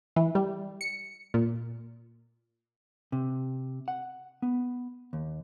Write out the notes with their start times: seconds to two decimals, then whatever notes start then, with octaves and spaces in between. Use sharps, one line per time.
0.16 E3
0.35 G3
0.81 C#7
1.34 A#2
3.12 C3
3.88 F#5
4.42 B3
5.13 D#2